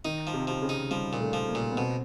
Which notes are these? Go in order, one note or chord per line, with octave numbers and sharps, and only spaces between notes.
D#3 D#4
F3
C3
C3 F3
C#3
D#4
F3 G3
A#2
A3
F3
A#3
A#2
B3
B2 C4